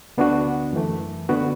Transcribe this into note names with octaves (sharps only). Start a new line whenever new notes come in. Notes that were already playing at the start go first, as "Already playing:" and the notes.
D2 D3 B3 D4 F#4
F#2 E3 A3
D3 B3 F#4